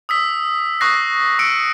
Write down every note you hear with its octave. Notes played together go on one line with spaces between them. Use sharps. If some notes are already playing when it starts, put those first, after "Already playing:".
D#6 E6 B6
C#6 D#6 F#6 A#6 C7
C#6 E6 C#7 D7